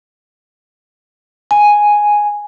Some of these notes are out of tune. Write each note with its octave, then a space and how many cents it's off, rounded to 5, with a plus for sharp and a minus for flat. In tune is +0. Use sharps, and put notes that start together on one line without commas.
G#5 +0